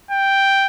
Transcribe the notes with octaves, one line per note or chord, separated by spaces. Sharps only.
G5